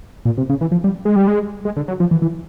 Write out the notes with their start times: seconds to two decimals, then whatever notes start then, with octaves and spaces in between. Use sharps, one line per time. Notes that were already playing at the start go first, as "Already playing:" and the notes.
0.25 A#2
0.38 C3
0.50 C#3
0.61 E3
0.72 F3
0.84 G3
1.05 G#3
1.16 G3
1.27 G#3
1.65 G#3
1.76 D3
1.88 F#3
2.00 F3
2.11 E3
2.22 E3